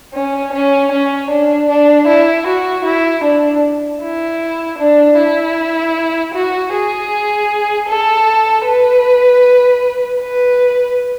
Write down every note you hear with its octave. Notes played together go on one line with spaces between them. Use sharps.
C#4
C#4
C#4
D4
D4
E4
F#4
E4
D4
E4
D4
E4
F#4
G#4
A4
B4
B4